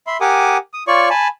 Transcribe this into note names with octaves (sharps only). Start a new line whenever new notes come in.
E5 B5 C6
G4 A#4 F#5 G#5 D6 D#6
D#6
F4 C#5 D5 C#6
G#5 A5 B5